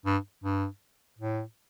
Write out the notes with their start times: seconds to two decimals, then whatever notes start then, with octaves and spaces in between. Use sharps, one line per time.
0.06 G2
0.43 G2
1.18 A2